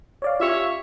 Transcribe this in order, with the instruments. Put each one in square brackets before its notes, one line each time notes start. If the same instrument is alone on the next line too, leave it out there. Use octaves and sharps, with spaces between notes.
[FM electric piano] C#5 D5 F5
[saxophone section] C#4 C#5 E5 [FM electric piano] F4 G4